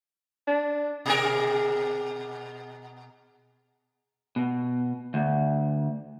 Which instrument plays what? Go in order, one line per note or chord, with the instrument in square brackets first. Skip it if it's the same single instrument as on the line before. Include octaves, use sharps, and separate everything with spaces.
[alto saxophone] D4
[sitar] B2 G#4 A#4
[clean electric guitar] B2
D2